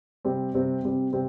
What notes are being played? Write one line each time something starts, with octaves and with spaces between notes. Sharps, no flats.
C3 G3 C4
C3 G3 C4
C3 G3 C4
C3 G3 C4